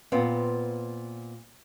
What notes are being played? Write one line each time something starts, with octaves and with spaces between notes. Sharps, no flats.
A#2 B3 C4